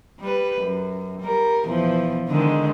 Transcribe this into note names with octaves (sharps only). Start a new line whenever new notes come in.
G3 B4
F#2
G3 A#4
E2 B2 F3
D3 D#3 G#3